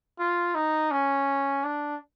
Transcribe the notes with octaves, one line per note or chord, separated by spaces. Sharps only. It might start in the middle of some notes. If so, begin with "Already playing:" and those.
F4
D#4
C#4
D4